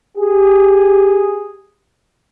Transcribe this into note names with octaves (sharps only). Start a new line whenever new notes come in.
G4 G#4